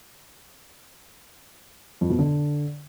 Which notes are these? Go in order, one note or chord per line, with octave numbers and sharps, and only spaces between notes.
F2
B2
D3